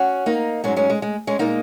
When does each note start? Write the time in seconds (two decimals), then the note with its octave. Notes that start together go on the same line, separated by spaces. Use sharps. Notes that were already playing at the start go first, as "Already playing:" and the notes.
Already playing: C#4 F#4
0.26 A#3 D#4
0.64 G#2 F#3 G#3 C#4
0.76 G#3 C#4
0.90 G#3
1.02 G#3
1.27 G#3 C#4
1.39 A#2 G#3 A#3 D#4